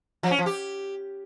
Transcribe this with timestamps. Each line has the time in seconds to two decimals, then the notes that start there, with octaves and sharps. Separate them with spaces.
0.23 F3
0.31 C#4
0.38 F3
0.46 G4